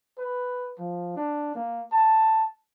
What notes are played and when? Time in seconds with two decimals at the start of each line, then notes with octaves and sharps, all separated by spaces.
0.18 B4
0.79 F3
1.16 D4
1.55 A#3
1.92 A5